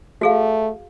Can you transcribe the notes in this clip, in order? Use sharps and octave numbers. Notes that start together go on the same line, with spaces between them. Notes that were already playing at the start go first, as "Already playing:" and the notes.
A3 F#4 G#4 F5